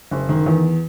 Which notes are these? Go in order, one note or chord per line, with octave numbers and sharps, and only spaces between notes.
F#1
D#3
E2